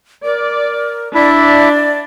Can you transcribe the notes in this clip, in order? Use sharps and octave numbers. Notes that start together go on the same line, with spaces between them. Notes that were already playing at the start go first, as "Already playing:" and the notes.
A#4 D5
D4 E4 D5 E5